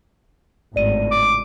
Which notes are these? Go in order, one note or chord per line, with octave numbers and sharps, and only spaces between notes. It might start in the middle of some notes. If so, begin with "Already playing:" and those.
G#1 C#2 A2 D5 D#7
D6